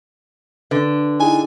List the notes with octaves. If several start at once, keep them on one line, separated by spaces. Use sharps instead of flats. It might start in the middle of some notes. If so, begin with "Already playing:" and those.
D3 B4
D#4 E4 G#4 G#5